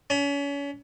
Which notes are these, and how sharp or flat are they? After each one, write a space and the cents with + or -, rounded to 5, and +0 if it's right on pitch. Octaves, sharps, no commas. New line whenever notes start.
C#4 +35